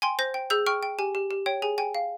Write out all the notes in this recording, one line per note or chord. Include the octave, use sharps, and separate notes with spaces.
G5 G#5 C6
C5 G6 A#6
G5
G#4 E6 G6
G5 C#6 F6
G5
G4 G#5
G4
G4
C#5 G5
G#4 G#5
G5 G#5
F5